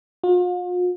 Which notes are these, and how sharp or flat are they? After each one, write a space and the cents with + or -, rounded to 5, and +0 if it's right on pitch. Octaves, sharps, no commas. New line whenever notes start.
F4 +45